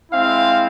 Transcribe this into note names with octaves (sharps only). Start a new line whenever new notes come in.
G#3 C4 E4 F5